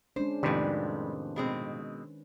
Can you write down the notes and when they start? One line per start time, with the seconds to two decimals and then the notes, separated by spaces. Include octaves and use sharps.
0.16 G#3 C#4 D4 C5
0.43 F2 A2 C3 D#3 G3 G#3 B4 C5
1.36 B2 G#3 C4